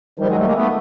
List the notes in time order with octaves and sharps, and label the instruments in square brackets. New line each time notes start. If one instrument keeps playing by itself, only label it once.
[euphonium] D#3 [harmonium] F3 G3
[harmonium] F#3 G#3
G3 A3
G#3 A#3
A3 B3